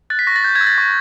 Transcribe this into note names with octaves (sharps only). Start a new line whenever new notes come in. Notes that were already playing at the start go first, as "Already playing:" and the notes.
F#6 A6
B6
C#6 A#6
A6
G6
G#6
E6
A6
C#6